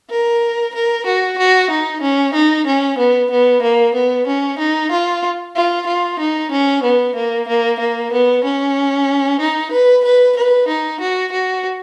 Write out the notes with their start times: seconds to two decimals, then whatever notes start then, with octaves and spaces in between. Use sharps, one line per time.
0.10 A#4
0.74 A#4
1.06 F#4
1.38 F#4
1.70 D#4
2.02 C#4
2.34 D#4
2.66 C#4
2.98 B3
3.31 B3
3.62 A#3
3.95 B3
4.27 C#4
4.59 D#4
4.92 F4
5.56 F4
5.87 F4
6.19 D#4
6.51 C#4
6.83 B3
7.15 A#3
7.48 A#3
7.79 A#3
8.12 B3
8.44 C#4
9.41 D#4
9.72 B4
10.04 B4
10.37 B4
10.68 D#4
11.00 F#4
11.32 F#4